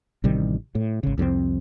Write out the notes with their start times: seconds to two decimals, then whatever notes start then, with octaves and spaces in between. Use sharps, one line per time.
0.24 A1 C3 D#3 G3
0.75 A2
1.03 G#1 C#3
1.18 C2 F2 C#3 C4